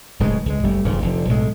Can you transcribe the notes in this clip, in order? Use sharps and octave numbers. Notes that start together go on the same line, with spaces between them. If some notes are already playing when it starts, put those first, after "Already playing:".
D1 A2 C#3 G#3
C#2 G#3
F#1 G3 A3
D1 F2 G#2 C#3
F1 D3 F3
B1 A2 G#3 A3